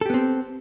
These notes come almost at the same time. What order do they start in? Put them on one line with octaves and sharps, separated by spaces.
A4 G4 B3 C4